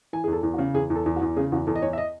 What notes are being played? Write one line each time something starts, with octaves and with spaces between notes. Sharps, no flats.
E3 G#5
E2 G#4
A4
E2
F#4
C#3
E2 G#4
E2
A4
E2
F#4
E2
C#3 G#4
E2 F#4
E2 A4
D#5
E2 C#5
E5
D#5